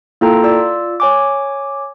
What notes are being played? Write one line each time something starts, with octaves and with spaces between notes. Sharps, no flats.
A#3 E4 F4 A4 G5 A#5
F4 D5 E6
C#5 G#5 D6